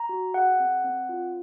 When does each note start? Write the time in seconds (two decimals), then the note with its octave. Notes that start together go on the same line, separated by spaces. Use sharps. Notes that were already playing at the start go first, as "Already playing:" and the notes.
Already playing: A#5
0.09 F#4
0.34 G#4 F#5
0.60 C4
0.84 C4
1.09 F4